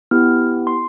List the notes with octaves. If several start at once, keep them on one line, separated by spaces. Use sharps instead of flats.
B3 E4 G4 F6
C6